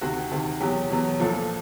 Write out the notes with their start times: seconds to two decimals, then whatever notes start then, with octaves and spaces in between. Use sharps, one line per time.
0.01 D2 C3 D#3 F#4
0.31 D2 C3 D#3
0.60 E2 B2 F#3 G4
0.90 E2 B2 F#3
1.20 B1 A#2 F3 A4